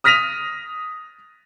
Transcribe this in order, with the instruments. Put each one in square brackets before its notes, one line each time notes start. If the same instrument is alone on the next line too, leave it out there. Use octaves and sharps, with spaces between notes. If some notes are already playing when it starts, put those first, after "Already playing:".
[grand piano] D#6 F6 A#6 B6 D#7 F7